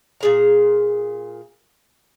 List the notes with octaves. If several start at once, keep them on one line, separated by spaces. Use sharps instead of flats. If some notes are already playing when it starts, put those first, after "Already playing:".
A#2 G#4 A#5